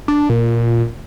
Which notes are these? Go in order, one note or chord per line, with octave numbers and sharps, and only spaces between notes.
D4
A#2